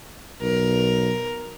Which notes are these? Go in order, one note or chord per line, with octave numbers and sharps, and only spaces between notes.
B1 A#4